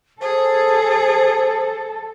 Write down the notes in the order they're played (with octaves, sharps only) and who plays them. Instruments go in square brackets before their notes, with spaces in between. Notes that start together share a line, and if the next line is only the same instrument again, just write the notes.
[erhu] G#4 [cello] A4 [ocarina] C5